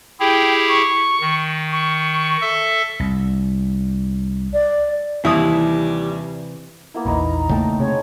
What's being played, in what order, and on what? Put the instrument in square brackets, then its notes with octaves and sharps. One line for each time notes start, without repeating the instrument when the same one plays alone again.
[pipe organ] E4 G4 G#4 [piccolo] G5
[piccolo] C#6
[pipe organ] D#3
[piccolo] C#6
[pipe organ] A4 E5
[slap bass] C2
[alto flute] D5
[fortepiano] D#2 D#6 [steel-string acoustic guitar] C3 E3 [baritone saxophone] G3 [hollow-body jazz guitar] E4
[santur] A#3 B3 E4
[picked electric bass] A#1 E2 E3 [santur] D#4 B5 [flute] A#5
[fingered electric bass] C#3 A3 A#3 [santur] G5 A5
[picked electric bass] C3 [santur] G#3 [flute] C#5